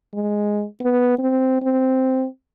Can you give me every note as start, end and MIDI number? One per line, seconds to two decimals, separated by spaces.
0.14 0.64 56
0.81 1.18 59
1.19 1.58 60
1.62 2.26 60